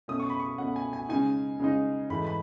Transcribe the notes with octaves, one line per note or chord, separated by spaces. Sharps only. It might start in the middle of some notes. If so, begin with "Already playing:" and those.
B2 A3 C#4 D#6
C#6
B5
C#6
B2 A3 C#4 F#5
G#5
G#5
C#3 G#3 D#4 G#5
C#3 G#3 D#4
G#2 E3 A3 B5
B5